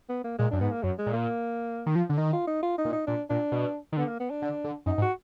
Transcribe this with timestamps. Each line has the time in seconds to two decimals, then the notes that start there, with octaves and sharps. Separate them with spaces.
0.09 B3
0.24 A#3
0.38 A#2 G#3
0.51 F#2 D4
0.61 G#2 B3
0.72 A#3
0.83 F#2 F#3
0.99 G#3
1.06 A#2
1.13 A#3
1.86 D#3
1.95 F3
2.09 D3
2.17 D#3 D#4
2.33 F4
2.48 D#4
2.63 F4
2.78 D#4
2.85 A#2
2.93 D#4
3.07 A#2 D4
3.30 A#2 D4
3.52 B2
3.92 D#3
3.97 D3 B3
4.08 A#3
4.20 B3
4.31 D4
4.42 D3
4.64 D3
4.86 F#2 D#4
4.98 G#2
5.02 F#4